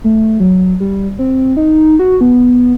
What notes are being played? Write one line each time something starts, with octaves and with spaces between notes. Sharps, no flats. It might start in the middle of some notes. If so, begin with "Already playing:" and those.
A3
F#3
G3
C4
D#4
F#4
B3